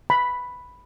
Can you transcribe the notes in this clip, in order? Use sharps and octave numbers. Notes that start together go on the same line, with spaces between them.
B5